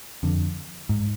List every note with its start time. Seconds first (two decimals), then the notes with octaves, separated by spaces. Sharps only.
0.23 F2 D3
0.89 G#2